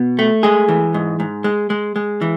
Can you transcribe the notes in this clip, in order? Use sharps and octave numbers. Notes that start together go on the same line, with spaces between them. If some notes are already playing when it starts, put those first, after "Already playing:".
Already playing: B2
A3
G#3 G#4
E3
G#2
G#2
G#3
G#3
G#3
E3